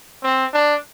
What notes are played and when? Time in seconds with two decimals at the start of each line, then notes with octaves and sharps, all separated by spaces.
0.23 C4
0.53 D4